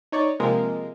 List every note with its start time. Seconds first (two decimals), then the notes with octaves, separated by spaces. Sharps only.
0.12 D#4 C#5 D5
0.40 C3 F3 G#3 A#3 A#4